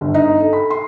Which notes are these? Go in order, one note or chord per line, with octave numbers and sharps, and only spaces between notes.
G1
D#4
A4
B5
C6